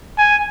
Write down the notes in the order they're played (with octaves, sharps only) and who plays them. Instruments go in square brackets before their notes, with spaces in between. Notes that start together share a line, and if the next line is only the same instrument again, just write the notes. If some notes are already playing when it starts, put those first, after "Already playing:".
[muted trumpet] G#5